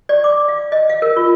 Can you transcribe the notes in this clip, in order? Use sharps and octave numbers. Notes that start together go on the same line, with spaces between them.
D5
D6
F5
D#5
F5
A#4
F4